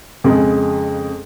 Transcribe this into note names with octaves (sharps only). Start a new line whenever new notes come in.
F2 C#3 G#3